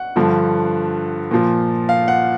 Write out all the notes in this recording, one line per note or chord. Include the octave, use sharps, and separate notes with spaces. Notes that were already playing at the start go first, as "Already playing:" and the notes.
Already playing: F#5
G2 D3 F3
A#2 F3
F5
F#5